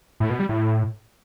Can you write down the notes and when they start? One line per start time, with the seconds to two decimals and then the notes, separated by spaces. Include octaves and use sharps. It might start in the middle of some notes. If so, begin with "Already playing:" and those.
0.20 A2
0.30 B2
0.40 G3
0.49 A2